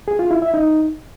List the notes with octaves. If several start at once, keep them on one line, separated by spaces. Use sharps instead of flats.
G#4
F4
E4
E5
D#4